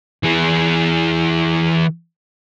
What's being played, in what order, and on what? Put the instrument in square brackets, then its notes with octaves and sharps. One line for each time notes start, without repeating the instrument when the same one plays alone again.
[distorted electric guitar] E3 G#4